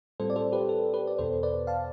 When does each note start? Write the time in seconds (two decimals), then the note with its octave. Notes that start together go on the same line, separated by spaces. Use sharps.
0.20 A2 G3 C4 F4 A4 C5
0.30 D5
0.36 A4 C5
0.52 G4 B4
0.69 A4
0.93 G4 B4
1.07 D5
1.18 E2 B2 B3 A4 C5
1.43 B4 D5
1.67 F5 A5